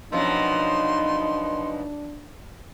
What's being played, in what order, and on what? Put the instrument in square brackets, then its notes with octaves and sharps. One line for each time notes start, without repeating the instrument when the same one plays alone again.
[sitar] F#2 B2 F3 [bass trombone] D4 [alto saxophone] D#4 [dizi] C6